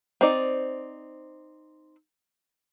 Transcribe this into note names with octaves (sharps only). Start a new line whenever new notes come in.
C4 D#4 D5